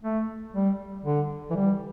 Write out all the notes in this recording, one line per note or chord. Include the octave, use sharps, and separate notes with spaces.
A3
G3
D3
E3
G3